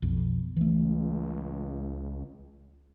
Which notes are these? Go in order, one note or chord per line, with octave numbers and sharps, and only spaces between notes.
B1 F2
C#2 E3 A3